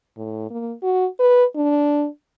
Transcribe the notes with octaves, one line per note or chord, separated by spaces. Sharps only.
A2
A#3
F#4
B4
D4